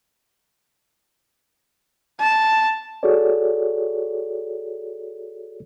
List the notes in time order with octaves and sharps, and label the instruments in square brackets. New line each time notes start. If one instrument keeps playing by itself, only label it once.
[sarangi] A5
[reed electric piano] F#4 G#4 A4 C#5 D5